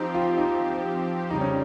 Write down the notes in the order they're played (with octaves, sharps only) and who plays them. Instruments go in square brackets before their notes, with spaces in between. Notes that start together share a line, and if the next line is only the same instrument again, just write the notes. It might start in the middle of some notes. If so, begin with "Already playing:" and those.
Already playing: [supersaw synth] F3 C4 G4 [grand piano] D#4
[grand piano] F4
D#4
[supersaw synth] F2 C#3 G3 [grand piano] D#4
[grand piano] C#4